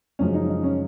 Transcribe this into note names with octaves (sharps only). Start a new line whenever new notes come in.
F#2 C#3 F3 G#3 C#4
D#4
D#4
C#4